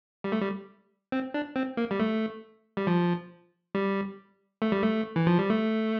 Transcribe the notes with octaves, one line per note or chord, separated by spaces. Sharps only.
G3
A3
G3
C4
D4
C4
A#3
G3
A3
G3
F3
G3
A3
G3
A3
E3
F3
G3
A3